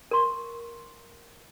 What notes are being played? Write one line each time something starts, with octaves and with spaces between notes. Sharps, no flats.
A#4 C6 C#6